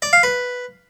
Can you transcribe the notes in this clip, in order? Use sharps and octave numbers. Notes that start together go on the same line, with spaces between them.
D5
F5
B4